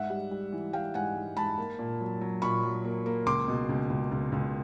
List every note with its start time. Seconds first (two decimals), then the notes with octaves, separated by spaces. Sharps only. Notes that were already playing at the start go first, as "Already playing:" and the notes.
Already playing: G#2 E5 F#5
0.10 G3
0.31 G3
0.53 E3
0.73 G3 F5 G5
0.94 G#2 F#5 G#5
1.16 G#2
1.37 G#2 A5 B5
1.58 A#3
1.79 A#2
2.00 F#3
2.21 F#3
2.42 A#2 B5 C#6
2.63 F#3
2.84 A#3
3.06 A#3
3.26 C#2 C6 D6
3.48 B2
3.69 C#2
3.90 C#2
4.11 C#2
4.32 C#2